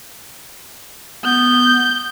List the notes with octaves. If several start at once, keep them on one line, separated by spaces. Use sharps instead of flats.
B3 G6